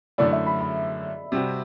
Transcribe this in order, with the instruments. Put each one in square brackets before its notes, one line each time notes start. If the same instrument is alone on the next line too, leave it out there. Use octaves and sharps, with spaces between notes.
[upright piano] F#2 D3 A3 E4 [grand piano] D5
[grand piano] E5
B5
B5
[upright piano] C3 G3 C4 F#4